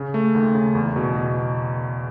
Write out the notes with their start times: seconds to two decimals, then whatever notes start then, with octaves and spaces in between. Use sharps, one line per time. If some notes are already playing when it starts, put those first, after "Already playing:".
Already playing: C#3
0.14 A3
0.35 D#2
0.55 C#3
0.75 E2
0.96 B2
1.16 B2